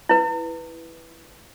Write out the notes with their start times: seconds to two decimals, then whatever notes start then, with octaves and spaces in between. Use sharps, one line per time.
0.09 E4 B4